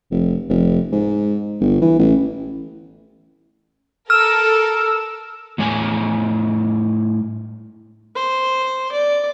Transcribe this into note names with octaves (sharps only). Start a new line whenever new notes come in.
F1
F1
G#2
G1
E3
A1
A4 A#4 E6 F6
A2 G3 C#5 G#5
C5
D5